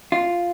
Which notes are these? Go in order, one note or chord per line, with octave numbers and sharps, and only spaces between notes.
F4